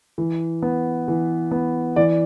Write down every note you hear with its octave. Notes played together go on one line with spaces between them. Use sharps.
E3
B3
E3
B3
E3 D5